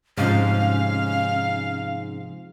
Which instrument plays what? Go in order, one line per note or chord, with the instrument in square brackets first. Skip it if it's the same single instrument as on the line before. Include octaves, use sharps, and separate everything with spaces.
[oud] G#2 [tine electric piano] C3 F3 [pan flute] C#4 [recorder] F5